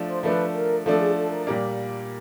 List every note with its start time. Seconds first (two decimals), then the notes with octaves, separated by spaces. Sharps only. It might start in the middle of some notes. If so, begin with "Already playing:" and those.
Already playing: F3 A3 D4
0.08 C5
0.23 F3 A3 D4 B4
0.54 A#4
0.86 F3 A3 D4 A4
1.00 G#4
1.16 A4
1.32 A#4
1.47 A#2 G3 A#3